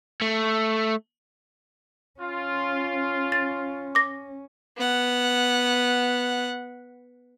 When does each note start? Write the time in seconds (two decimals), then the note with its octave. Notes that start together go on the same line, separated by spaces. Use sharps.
0.22 A3
2.20 C#4 F4
3.32 A6
3.95 D6 A#6
4.77 B3 F#5